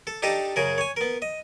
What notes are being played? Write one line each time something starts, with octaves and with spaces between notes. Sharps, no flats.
A4
D4 D#4 G4 A4 D#5 A#5
F#2 C#3 G#4 A#4
C#5 G#5
B3 A#4
D#5